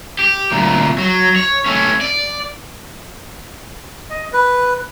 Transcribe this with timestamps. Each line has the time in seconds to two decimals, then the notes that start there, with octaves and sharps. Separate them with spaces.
0.19 G4
0.52 D2 A#2
0.98 F#3
1.36 C#5
1.66 A3 C#4
2.01 D5
4.10 D#5
4.33 B4